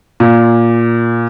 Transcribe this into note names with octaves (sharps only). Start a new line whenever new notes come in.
A#2